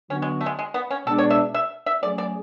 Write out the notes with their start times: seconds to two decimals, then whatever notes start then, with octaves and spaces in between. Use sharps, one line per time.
0.10 D3 F#3 B3 C#4 F#4
0.22 G#3
0.41 A3
0.46 G#3
0.59 G#3
0.74 B3
0.91 C#4
1.07 B2 G#3 B3 D4 A4
1.18 C#5
1.30 E5
1.54 E5
1.86 E5
2.03 F#3 A3 C#4 G#4 D5
2.18 D5